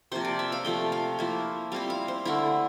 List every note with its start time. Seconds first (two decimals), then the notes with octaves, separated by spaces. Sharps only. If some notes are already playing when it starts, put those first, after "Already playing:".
0.12 C3 F3 A#3 C5
0.25 D5
0.39 E5
0.52 F5
0.65 C3 F3 A3 G5
0.92 F5
1.19 F3 A#3 E4
1.72 G3 C4 E4 F5
1.90 F5
2.08 C5
2.25 D3 A3 E4 A#4